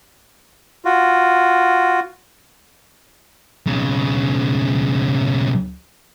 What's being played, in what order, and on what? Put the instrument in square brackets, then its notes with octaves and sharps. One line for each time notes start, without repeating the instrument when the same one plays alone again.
[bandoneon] F4 F#4
[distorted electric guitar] B1 C#3